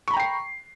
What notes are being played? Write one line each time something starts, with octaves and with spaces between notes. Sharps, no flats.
G5 A#5 B5 C#6 C7